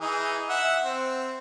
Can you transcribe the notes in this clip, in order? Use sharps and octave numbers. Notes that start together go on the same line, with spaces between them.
E3 D#4 G#4
E5 F#5
C4